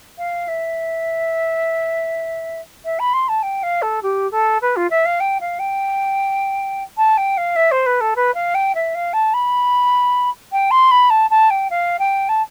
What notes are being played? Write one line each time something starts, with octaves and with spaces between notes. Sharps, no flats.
F5
E5
E5
B5
C6
A5
G5
F5
A4
G4
A4
B4
F4
E5
F5
G5
F5
G5
A5
G5
F5
E5
C5
B4
A4
B4
F5
G5
E5
F5
A5
B5
G5
C6
B5
A5
A5
G5
F5
G5
A5